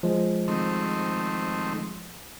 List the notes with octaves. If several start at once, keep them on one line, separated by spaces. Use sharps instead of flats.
F3 G#3
D#3 A3 C4